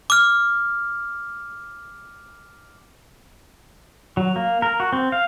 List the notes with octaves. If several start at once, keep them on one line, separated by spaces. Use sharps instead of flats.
D6 F6
F#3
A#3
A#4
F#4
C4
F5